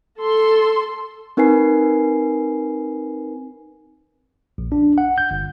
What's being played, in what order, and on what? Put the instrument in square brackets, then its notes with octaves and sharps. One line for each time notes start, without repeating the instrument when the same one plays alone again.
[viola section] A4 C6
[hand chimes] C4 D#4 A#4 B4 G#5 C7
[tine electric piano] A#1
D4
F#5
G6
G1